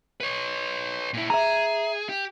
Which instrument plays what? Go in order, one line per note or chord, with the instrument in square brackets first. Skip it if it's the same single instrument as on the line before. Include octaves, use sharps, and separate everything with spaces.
[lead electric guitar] B4 C#5
A#2 E4
[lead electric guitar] G#4 [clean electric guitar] E5 A#5
[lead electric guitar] G4